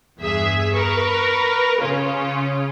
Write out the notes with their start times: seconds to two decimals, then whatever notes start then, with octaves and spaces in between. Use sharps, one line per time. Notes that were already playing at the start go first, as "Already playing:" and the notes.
0.19 E2 G2 G#4 E5 B6
0.74 A#4 B4 C#6
1.80 C#3 C#4 F4